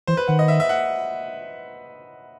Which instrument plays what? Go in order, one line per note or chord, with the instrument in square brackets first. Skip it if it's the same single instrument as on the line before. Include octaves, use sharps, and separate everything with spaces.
[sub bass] E3 [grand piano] C5
[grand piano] B4
[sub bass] D#3 [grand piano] F#5
[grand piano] D#5
E5
E5
F#5